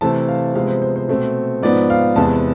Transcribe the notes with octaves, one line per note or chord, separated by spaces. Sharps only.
C3 E3 A3 C4 A5
F5
C3 F3 G#3 B3 F5
C5
C5
C5
B2 A3 C4
G#2 F3 B3 D5
F5
E2 C3 G#3 B3 A5